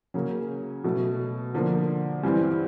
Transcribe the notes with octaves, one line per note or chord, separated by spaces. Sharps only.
C#3 F#3 A#3 C#4
B2 F#3 A3
D3 F3 A#3 D4
G2 E3 G3 C4